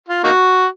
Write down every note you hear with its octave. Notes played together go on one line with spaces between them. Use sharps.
F4
A#3 D#4 F#4